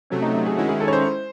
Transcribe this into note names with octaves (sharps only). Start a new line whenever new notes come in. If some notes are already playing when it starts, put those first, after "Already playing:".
C3 F#3 A3 C#4
D#4
D#4
G#4
D#3 G#3 C#4 E4 F#4
G#4
A4
C#5
C5